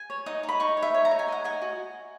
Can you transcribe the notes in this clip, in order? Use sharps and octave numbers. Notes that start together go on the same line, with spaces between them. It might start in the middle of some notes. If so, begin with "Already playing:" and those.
Already playing: G#5
C#5
D#4 D#6
D#4
B5
D#4 C#6
C#5
E5
C#5
A#5
D#4
G#5
D#5 F#5
D#5 G#5
F#4